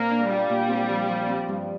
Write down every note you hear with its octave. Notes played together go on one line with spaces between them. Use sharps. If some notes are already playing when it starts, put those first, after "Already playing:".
Already playing: A#2 A#3 C4
D4
G3 F4
A#2
C4
F3
F3
C4
G2